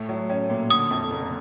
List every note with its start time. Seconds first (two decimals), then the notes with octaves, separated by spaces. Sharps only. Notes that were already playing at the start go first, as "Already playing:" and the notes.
Already playing: A2 A3
0.09 F#3
0.30 C#4
0.50 A#2
0.70 D3 D#6
0.91 F2
1.11 F#1